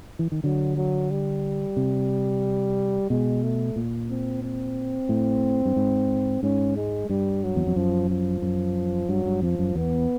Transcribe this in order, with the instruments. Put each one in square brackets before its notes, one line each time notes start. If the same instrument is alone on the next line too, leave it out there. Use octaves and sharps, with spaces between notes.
[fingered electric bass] E3
D#3
[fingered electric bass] D3 [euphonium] F#3
[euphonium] F#3
G3
[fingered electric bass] C3
[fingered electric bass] B2 [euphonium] G#3
[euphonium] A3
[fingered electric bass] A#2
[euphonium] C4
C4
[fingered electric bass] A2
G2
G#2
[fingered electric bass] G#2 [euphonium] C#4
[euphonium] G#3
[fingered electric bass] G2 [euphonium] G3
[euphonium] F#3
[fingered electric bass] E2
F2
[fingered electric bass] F#2 [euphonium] F3
[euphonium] F3
[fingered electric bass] F#2
[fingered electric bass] G2 [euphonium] F#3
[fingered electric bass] G2
[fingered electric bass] F2 [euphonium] F3
[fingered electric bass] F#2
[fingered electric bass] E2 [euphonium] B3